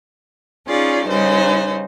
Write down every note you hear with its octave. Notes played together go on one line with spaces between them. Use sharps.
C#4 D#4 F4 G#4 D5
G2 C#3 G3 D#4 C5